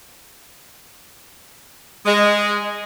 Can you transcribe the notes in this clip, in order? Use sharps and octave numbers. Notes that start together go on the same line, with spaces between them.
G#3